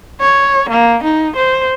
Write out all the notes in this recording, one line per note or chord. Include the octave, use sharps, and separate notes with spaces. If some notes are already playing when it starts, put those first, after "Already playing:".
C#5
A#3
D#4
C5